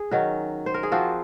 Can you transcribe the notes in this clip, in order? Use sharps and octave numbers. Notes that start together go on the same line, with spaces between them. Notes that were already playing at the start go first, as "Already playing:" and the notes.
Already playing: G#4
D#3 F#3 C#4 F#4
C5
A#4
G#4
F3 C4 F4 F#4